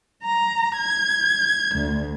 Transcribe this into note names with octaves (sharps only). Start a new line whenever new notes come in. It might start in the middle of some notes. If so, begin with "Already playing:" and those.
A#5
G#6
D2